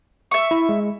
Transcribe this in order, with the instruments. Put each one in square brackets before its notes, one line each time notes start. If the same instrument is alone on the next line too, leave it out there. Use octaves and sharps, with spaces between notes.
[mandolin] E5 C#6
[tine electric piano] E4
G#3